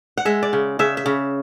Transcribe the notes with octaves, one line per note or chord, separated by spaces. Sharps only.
F#5
G#3 E5
D5
C#3
C#3 E5
E5
C#3